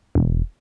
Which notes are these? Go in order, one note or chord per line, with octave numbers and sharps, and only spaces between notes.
E1